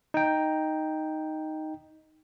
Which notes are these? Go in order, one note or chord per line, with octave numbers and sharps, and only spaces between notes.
D#4 G5